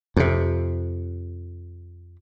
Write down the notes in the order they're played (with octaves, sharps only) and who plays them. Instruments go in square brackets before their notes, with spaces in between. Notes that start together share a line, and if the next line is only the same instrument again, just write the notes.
[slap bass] F2 C3